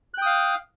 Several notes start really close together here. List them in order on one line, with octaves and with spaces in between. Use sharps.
F#6 G5 D#6 F5